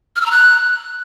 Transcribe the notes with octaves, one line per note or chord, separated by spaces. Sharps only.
F6
E6
A#5
F#6